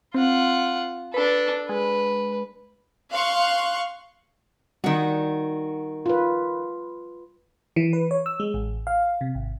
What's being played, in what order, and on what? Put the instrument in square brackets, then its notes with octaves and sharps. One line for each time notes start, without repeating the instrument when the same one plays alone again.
[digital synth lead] C4 [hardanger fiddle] F4 F#5
[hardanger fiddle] D4 A4 [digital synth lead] B4
[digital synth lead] G#3 [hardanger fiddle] B4
[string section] F5 C6 C#6 F#6
[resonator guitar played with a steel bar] D#3 F#4 [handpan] G3
[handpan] F4 B4
[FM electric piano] E3
B4
C#5
E6
G#3
A1
F5
C3
G#1